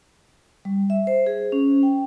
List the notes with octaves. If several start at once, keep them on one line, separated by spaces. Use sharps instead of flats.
G3
E5
C5
G#4
C#4
G5